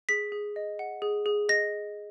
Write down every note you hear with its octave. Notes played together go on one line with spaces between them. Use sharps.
G#4 B6
G#4
D#5
F#5
G#4
G#4
D#5 A#6